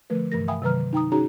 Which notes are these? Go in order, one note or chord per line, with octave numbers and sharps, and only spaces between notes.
D3 F3 A3 A#4 B4
G2 C3 E3 A3 A#4 A#6
E5 F5 G5 G#5 B5 D#6
C3 D#3 F#3 B4 A#5 F6
D#4 G5 A#5 D#6
C#4 D#4 F#4 G#4 C#5 A#5